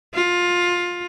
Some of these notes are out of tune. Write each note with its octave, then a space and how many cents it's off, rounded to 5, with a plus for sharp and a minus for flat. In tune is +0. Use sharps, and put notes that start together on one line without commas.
F4 +15